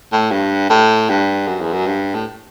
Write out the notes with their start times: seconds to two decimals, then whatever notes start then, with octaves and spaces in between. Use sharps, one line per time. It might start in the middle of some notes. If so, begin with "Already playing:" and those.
0.12 A2
0.31 G2
0.70 A2
1.09 G2
1.47 F#2
1.61 E2
1.73 F#2
1.86 G2
2.14 A2